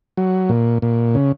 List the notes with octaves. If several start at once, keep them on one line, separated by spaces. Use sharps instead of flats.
F#3
A#2
A#2
C#3